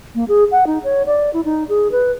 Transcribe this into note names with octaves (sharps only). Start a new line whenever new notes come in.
A#3
G#4
F#5
D#4
C#5
D5
E4
D#4
G#4
B4